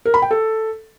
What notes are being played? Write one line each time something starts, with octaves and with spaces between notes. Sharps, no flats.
A#4
B5
G5
A4